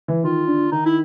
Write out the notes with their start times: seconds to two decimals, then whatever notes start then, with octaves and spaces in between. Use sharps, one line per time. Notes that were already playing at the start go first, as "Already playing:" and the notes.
0.08 E3
0.23 D#3 F4
0.47 D3
0.71 D#3 D#4
0.85 E4